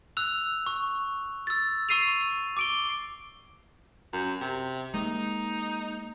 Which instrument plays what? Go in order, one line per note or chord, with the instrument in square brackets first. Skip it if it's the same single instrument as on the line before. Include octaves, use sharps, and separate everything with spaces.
[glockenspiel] E6 F#6 F7
C#6
E6 A6
C#6 E6 C7 D#7 F7
D6 D7 G7
[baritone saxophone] F#2
C3
[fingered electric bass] G#3 A#3 [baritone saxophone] D#4